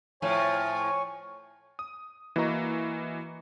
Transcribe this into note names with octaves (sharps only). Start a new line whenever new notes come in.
A2 F3 C#5 G#5 C#6
D#6
E3 A#3 F#4 D#5 A#5 C#6